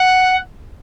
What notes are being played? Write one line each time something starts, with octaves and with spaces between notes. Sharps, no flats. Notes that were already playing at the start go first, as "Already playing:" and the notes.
Already playing: F#5